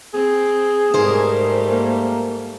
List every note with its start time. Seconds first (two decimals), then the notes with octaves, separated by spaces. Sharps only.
0.14 C4 G#4
0.94 G#2 G3 A3 A#4 C5
1.71 A#3